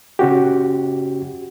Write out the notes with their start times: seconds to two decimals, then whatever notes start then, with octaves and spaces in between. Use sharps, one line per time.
0.19 C#3 C#4 F#4 G4